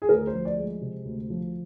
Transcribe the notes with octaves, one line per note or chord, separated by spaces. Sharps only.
G#4
D2 A#4
C5
F3
D5
G#3
C3
D2
F3